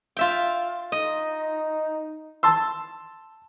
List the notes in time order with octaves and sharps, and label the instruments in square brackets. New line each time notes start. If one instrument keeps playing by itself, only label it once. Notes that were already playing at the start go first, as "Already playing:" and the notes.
[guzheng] F4 E5 G5
[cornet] D#4 [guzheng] D#5
[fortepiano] A5 C6 E6